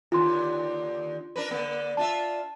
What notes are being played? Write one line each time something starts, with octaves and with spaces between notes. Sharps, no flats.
D#2 D3 F4 C6
D4 A#4 B4
D3 A#3
D4 F4 E5 A5